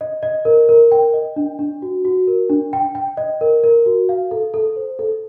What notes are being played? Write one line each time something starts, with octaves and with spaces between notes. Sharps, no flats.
D#5
D#5
A#4
A#4
G5
D#5
D4
D4
F#4
F#4
A#4
D4
G5
G5
D#5
A#4
A#4
F#4
F5
A4
A4
C5
A4